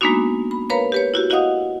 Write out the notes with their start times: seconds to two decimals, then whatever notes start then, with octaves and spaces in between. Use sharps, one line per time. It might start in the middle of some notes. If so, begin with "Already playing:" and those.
0.01 G#3 A#3 B3 D4 D#4 F#4
0.51 B5
0.70 A#4 B4 C#5 F5 A#5 B5
0.92 G4 B4 C#5
1.14 E4 F#4 G4
1.30 E4 F#4 D#5 F5 F#5 D#6